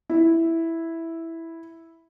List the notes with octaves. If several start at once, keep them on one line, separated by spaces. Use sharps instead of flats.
E4